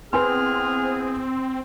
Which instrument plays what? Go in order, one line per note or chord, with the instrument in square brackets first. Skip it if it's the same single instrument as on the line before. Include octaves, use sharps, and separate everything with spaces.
[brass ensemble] B3 E4 G#4 [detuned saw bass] C4 [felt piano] B4 G#5 C6 [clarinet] F6